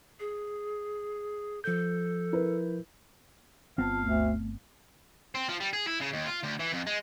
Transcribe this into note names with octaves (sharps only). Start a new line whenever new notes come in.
G#4
F3 A4 G6
E4 A#4 B4
G1 B3 C4 F4 F5 A5
D2 A3
C4
F3
G3
G#4
E4
C#3
D#2
F4
D2
E3
F2
G#3